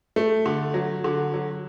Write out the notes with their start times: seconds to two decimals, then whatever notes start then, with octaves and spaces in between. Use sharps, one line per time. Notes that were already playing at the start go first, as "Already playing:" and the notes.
0.16 A3
0.46 D3
0.74 F#3
1.04 D3
1.34 F#3